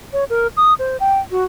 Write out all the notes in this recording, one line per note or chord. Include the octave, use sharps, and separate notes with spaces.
C#5
A#4
D#6
C5
G5
F#4